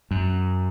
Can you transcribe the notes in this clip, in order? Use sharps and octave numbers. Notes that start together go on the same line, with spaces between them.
F#2